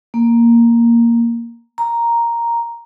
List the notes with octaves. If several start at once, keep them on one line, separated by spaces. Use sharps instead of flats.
A#3
A#5